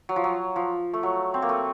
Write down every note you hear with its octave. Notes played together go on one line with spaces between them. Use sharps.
F#3
F3
F#3
F3
A3
F#3
C4
A#3
A3